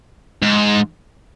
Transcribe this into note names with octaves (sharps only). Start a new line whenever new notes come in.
G#2